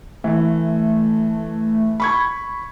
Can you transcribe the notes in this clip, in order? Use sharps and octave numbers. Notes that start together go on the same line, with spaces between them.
E3 A3
B5 C#6 G#6